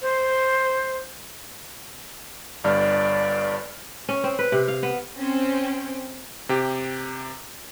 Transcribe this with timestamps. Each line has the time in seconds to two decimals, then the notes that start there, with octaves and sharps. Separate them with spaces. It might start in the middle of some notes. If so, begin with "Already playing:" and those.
0.01 C5
2.64 G1 G2 D5 F6
4.09 C#4
4.24 C4
4.39 B4
4.52 C3
4.68 F5
4.83 B3
5.18 C4 C#4 G5
6.49 C3 G4